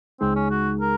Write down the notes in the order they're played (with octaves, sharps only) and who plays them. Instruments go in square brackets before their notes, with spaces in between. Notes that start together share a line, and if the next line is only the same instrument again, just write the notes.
[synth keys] C#2 C#3 G#3 D#4 G#4 [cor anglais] C4
[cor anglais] C#4
F#4
A#4